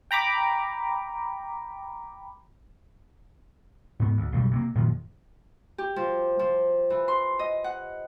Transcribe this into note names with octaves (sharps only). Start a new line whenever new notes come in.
G5 A#5 B5 D6
G#2 B3
D2
B1 F#2 D#3 G3
C3 A3 A#3
F#2 A#2 D#3 F3
G4
F3
F3
E3
C6
D#5
F#5